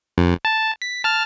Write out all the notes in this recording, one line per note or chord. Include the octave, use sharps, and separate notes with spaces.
F2
A5
B6
A5 F6